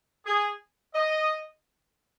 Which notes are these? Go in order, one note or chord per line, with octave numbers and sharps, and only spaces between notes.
G#4
D#5